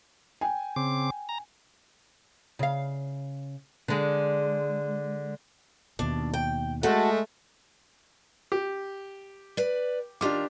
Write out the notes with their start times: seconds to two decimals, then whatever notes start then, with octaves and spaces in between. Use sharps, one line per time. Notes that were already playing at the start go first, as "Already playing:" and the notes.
0.41 G5 G#5
0.76 C#3 C4 D6
1.29 A#5
2.59 C#3 F5
3.88 D3 G#3
5.99 D#2 B2 D4
6.34 G5
6.83 G#3 A3 F#4 A4
8.52 G4
9.57 B4 D5
10.21 D#3 D4 F4 G4 A#5 D6